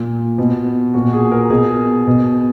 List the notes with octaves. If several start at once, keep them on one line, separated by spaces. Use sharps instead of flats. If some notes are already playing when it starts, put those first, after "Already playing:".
Already playing: A#2
B2
A#2 F#4
G#4
A#4
B2 G#4
B2